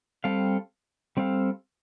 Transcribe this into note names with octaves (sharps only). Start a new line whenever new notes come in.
G3 C4 A4 F5
G3 C4 A4 F5